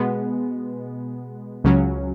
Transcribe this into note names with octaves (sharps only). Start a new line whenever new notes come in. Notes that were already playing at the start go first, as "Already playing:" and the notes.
Already playing: B2 G#3 B3
C#2 C#3 F#3 C#4